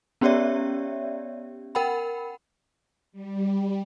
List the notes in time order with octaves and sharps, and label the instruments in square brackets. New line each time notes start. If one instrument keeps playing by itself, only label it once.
[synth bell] B3 C#4 G4 C#5 D5 E5
A#4 F#5 G5 B5
[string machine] G3